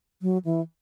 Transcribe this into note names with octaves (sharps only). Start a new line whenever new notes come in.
F#3
E3